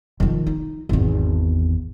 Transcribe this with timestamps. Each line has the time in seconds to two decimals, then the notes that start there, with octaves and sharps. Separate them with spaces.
0.20 D#3 F3
0.47 D#4
0.89 G#1 E2